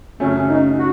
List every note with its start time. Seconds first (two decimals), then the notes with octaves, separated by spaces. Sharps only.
0.19 F#2 C#3 F#3 A3 C#4
0.35 C#4
0.49 D#4
0.77 F#4